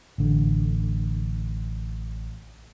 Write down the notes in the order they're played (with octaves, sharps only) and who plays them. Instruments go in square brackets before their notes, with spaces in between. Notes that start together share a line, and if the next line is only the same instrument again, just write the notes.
[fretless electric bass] A1 D3